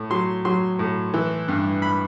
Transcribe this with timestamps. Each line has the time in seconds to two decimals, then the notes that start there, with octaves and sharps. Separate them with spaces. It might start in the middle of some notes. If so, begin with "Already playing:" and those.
Already playing: A2
0.10 F#3 C6
0.45 F#3 C6
0.79 A2
1.14 E3
1.48 G2
1.82 B5